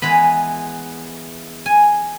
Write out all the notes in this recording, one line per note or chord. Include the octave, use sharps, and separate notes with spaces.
E3 G#3 B3 B5
G#5